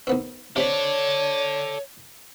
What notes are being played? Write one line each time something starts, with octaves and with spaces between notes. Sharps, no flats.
D#2 B3 C4
C3 G4 A4 C#5 D5 B5